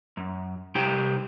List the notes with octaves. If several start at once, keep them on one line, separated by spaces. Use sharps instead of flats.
F#2
C2 D#4 G4 C5 G5